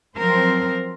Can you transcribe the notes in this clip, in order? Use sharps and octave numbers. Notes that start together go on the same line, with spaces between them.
F3 F#3 C4 A#4 C5